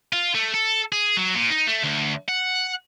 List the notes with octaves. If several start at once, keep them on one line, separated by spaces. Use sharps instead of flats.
F4
A3
A4
G#4
F#3
A#2
D#4
A3
D2
F#5